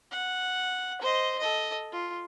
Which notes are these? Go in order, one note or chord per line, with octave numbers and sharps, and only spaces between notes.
F#5
C5 D#5
A4 D#5
F4